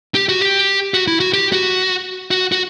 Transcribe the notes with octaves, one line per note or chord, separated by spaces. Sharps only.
G4
F#4
G4
F#4
E4
F#4
G4
F#4
F#4
F#4